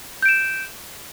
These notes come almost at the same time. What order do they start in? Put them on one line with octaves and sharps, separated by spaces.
G6 D7 E7